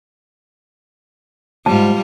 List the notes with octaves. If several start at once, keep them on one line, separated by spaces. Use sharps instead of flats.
F2 G#2 G3 F4 A5